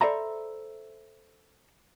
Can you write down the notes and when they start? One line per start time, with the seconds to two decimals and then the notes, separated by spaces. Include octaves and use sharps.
0.01 A4 C5 D5 E5 A#5 B5